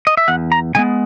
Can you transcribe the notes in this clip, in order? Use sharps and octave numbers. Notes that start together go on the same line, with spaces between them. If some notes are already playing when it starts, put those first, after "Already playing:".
D#5
E5
E2 F#5
A#5
C#3 G#3 B3 G#5